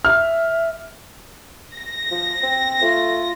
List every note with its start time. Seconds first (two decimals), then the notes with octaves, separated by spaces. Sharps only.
0.05 E5 F6
1.76 A#6
2.11 F3
2.43 C4
2.82 A3 F4